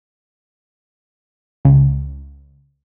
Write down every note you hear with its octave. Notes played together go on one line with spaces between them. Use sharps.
C#2